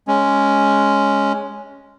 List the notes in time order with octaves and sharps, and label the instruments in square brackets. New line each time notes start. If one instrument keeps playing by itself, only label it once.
[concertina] G#3 C#4